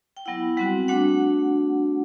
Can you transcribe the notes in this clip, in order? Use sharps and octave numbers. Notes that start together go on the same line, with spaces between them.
G5
F#3 B3 E4 F#5
G3 C4 F#4 F#5
A3 D4 F#4 F#5